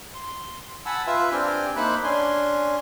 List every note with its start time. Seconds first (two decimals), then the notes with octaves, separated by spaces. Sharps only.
0.15 C6
0.86 F#5 G#5 A5 B5 E6
1.07 F4 B4 E5
1.31 C4 D4 G4 G5 G#5 F6
1.76 A#3 D#4 E4 C5 B5 F#6
2.04 C#4 D4 G#5 C6